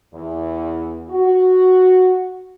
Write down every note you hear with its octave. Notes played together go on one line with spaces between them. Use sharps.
E2
F#4